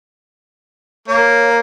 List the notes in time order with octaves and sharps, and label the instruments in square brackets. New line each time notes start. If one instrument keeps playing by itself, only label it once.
[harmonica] A#3 [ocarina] C#5